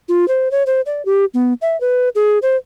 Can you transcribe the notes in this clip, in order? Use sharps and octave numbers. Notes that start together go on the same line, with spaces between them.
F4
C5
C#5
C5
D5
G4
B3
E5
B4
G#4
C5